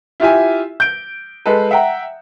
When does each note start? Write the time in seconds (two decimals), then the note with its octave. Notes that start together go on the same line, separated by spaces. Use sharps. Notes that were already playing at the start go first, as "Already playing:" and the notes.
0.20 E4 F4 G4 E5 G#5
0.80 G6 D7
1.46 G#3 A4 B4
1.71 E5 F#5 G5 A#5